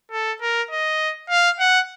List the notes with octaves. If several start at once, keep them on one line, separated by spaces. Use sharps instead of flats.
A4
A#4
D#5
F5
F#5